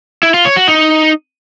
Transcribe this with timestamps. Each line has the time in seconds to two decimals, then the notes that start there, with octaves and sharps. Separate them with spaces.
0.23 E4
0.34 F4
0.45 C#5
0.56 F#4
0.68 D#4